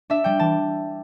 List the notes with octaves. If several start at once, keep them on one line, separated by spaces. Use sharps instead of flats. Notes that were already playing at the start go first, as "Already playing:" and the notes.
D4 E5
G3 G5
E3 A5